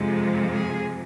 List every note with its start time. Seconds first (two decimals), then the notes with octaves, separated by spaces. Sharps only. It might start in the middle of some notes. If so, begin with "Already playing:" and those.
Already playing: F2 C3 F3 G#3
0.52 G#4